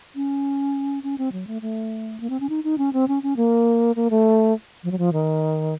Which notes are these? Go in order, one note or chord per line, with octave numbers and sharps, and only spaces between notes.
C#4
C#4
C4
F#3
A3
A3
A#3
C4
C#4
D#4
D#4
C#4
C4
C#4
C#4
A#3
A#3
A3
F3
F#3
F3
D#3